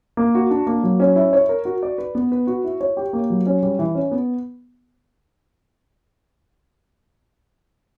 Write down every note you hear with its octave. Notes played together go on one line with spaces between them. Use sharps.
A#3
F#4
D4
A#3
F#3
C#4
E4
C#5
A#4
F#4
D5
B4
B3
B4
F#4
E4
C#5
G4
A#3
F#3
C#4
G3
E3
C#4
B3